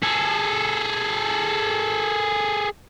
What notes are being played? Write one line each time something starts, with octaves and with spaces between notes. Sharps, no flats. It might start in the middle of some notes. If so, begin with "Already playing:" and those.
G#4 A4